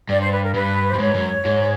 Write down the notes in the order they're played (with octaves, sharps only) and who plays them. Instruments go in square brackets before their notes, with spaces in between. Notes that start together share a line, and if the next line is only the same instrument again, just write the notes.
[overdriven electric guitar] G2 [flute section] D5
[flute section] C5
B4
A#4
[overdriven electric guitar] G2 [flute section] B4
[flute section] C5
[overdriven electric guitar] G2
[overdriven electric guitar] G#2 [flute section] C#5
[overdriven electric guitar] F#2
G#2